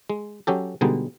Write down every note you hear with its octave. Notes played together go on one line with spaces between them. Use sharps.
G#3
F#3 C#4 G4 A4
B2 D3 G3 G#3 D#4